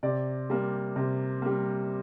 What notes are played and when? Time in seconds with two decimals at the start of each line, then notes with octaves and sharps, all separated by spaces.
0.03 C3 D5
0.50 G3 A#3
0.96 C3
1.42 G3 A#3